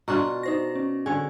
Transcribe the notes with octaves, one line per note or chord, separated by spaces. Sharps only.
B2 D4 F4 A#5 C#6
D#4 C5 A#6
C#4
D3 G#4 C#5 G#5